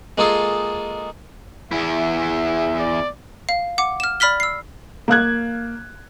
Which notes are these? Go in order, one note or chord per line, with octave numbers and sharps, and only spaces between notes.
G#3 A#3 F4 G#4 A4
E2 E4 E5
D5
F5
F#5 D6
F6 E7
D5 B5 F6 B6 G7
E6 C7
A#3 F5 F#6 G#6